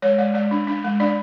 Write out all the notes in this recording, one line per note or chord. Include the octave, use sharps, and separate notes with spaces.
G#3 C#5
G#3 D5
G#3 D5
D4
D4
G#3
D4 D5